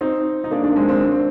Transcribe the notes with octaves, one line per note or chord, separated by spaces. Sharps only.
C4 D#4
D#4
A#3 D4
A#3 D4
G#3 C4
G#3 C4
D4
C4